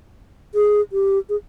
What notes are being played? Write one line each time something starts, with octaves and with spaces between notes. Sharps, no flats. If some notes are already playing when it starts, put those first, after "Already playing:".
G#4
G4
G#4